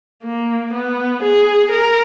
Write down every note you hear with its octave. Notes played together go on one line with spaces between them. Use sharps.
A#3
B3
G#4
A#4